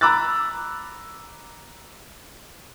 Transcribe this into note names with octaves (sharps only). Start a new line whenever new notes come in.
A#5 B5 D6 E6 F#6 A6